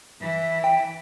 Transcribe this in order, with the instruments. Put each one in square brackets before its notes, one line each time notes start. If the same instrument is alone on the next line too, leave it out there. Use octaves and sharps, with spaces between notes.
[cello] E3 E4
[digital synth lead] G5